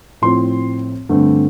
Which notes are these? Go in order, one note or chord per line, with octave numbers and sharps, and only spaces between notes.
A2 F3 C4 C6
G2 D3 A3 C4